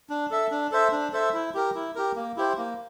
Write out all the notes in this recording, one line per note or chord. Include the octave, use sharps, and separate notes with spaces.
D4
A4 E5
D4
A4 C5 E5
D4
A4 C5 E5
E4
G4 A#4
E4
G4 A#4
A#3
E4 G4 C5
A#3